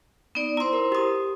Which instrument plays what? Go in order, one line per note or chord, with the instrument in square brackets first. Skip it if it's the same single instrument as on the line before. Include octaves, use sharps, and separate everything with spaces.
[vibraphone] B3 D#4 D5
[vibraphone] E4 C5 [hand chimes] A#5 C6
[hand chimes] A#4
G4 D#6